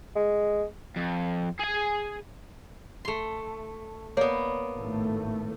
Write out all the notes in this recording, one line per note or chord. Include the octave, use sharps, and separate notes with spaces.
G#3
F2
G#4 G#5
A3 C6
A#3 B3 C#5 D5
G#1 A2 A3